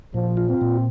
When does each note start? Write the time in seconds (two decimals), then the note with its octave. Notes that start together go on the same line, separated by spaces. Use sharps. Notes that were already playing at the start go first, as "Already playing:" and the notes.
0.14 A#2 F3
0.37 F4
0.49 C4
0.61 A#2